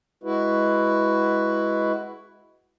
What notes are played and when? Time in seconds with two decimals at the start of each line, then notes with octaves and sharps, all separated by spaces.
0.24 G#3 E4 F#4 B4